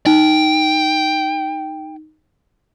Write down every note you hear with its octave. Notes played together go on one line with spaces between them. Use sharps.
D#4 G5